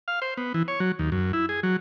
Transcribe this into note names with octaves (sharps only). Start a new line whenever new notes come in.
F5
C5
B3
E3
C#5
F#3
D#2
F#2
E4
G#4
F#3